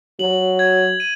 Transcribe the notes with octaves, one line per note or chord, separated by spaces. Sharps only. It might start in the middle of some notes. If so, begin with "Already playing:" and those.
F#3 F#7
G#6
D#7